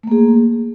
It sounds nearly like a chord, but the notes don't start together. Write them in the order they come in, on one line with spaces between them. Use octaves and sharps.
A3 A#3 G#4